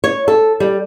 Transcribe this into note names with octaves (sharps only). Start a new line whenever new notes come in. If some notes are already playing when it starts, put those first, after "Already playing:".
C#5
A4
G3